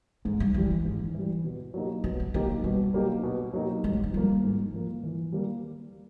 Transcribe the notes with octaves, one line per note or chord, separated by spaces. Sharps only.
G#2 G#3
G3
E3 F3 G3
E3
G#2
E3 G3
B2
F#3 A#3 D#4 G4
B2 F3
F#3
F3 F#3 A#3 D#4 G4
B2 G3
F#3 A#3 D#4 G4
B2
F#3 A#3 D#4 G4
G#2 G#3
G3
F#3
F3 G3 A#3
G#2
F3 A#3
E3
G3 A#3